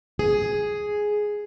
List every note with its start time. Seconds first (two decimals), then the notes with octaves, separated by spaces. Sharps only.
0.19 G#4